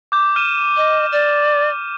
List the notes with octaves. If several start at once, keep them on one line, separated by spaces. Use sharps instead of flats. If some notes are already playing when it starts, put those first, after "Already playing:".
D6 G6
F6 D#7 E7
D#5
D5